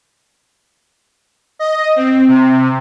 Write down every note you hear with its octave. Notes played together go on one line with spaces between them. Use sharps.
D#5
C4
C3